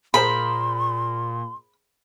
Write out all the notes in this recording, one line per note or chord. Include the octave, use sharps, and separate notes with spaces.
A#2 G#4 A#4 C5 B5 C6